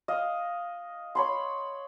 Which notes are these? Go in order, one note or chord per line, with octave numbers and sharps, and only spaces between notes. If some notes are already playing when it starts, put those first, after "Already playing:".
D#5 F5
C#5 B5 C6